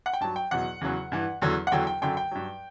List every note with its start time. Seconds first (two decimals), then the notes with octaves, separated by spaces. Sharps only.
0.06 F#5
0.13 G5
0.21 G2 F#3 A5
0.36 G5
0.51 E2 B2 F#3 F#5
0.81 E2 C#3 F#3
1.12 G2 E3
1.42 E2 D3 F#3
1.67 F#5
1.72 E2 D3 F#3 G5
1.87 G5
2.02 F#2 D3 F#3 G5
2.17 G5
2.32 G2 F#3